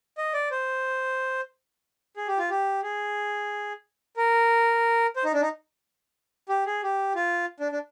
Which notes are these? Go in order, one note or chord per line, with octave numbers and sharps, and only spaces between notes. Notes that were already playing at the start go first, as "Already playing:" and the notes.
D#5
D5
C5
G#4
G4
F4
G4
G#4
A#4
C5
D#4
D4
D#4
G4
G#4
G4
F4
D4
D4